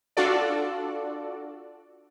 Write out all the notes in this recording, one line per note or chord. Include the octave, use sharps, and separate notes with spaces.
D4 F4 F#4 A4 D5